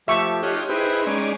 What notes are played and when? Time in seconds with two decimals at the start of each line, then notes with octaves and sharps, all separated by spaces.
0.08 F3 A3 G4 E5 C#6
0.43 D#4 F4 G4 C#5 F#6
0.69 D#4 E4 G#4 B4 C5 G5
1.07 G#3 C#4 D#4 D5 G#5